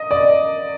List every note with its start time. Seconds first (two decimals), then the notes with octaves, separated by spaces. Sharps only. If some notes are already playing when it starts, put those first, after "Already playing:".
Already playing: D#5
0.11 D5